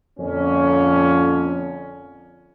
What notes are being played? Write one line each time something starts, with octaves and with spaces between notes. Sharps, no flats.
F2 A#2 D3 C#4